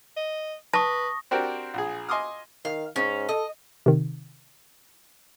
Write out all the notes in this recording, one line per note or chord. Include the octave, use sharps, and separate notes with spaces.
D#5
B4 A5 C#6 D#6 A#6
C4 D4 F#4 G4 A#4 C5
A#1 G#4
D#5 G#5 C6 D6 D#6 F6
D#3 F5
G#2 C#4
A4 D#5
C3 D#3